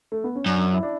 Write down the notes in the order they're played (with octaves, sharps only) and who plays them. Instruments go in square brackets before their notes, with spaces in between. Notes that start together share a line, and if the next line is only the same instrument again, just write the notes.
[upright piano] A3
B3
C#4
[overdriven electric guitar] F#2 [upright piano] D4
[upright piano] E4
D4